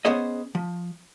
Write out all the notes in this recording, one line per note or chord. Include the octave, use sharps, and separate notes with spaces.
B3 C#4 G#4 C5 D#5
F3